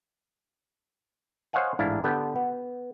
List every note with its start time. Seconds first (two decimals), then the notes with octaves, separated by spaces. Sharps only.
1.53 C5 C#5 D#5 F5 F#5 G#5
1.79 A1 G#2 D4 E4 F5
2.04 D3 B3 G4 B4 G5 A5
2.36 B3